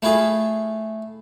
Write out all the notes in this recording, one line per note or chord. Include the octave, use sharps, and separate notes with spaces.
A3 E4 F4 G#4